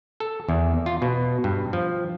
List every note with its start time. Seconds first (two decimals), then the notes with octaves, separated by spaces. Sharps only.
0.20 A4
0.49 E2
0.86 F4
1.02 B2
1.44 G2
1.73 F3